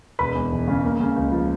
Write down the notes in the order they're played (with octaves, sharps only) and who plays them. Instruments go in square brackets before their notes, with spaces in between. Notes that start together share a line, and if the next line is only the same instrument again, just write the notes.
[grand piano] E1 B4 B5
E2
E1
C#3
A#3
C#3
C#2
F3